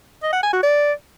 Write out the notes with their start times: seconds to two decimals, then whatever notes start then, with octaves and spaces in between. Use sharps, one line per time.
0.23 D#5
0.33 F#5
0.43 G#5
0.53 F#4
0.63 D5